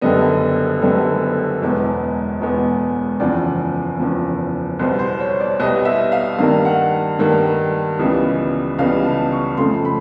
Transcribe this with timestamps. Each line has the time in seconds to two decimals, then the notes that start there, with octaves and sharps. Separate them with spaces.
0.02 F#1 F#2 D3 G3 B3 D#5
0.82 F#1 F#2 D3 G3 B3
1.61 E1 E2 B2 G#3 B3
2.41 E1 E2 B2 G#3 B3
3.20 F#1 E2 C#3 F3 D5
3.99 F#1 E2 C#3 F3
4.79 C2 B2 G3 B3 C5
4.99 C5
5.20 C#5
5.40 D5
5.60 C2 B2 G3 B3 D#5
5.85 E5
6.12 F5
6.38 G2 D#3 G3 A#3 F5
6.65 F#5
7.19 G2 D#3 G3 A#3
7.99 C#2 C#3 E3 G3 B3
8.78 C#2 C#3 E3 G3 B3 F5
9.04 A5
9.32 C#6
9.57 F2 C#3 F3 A3 C6
9.85 B5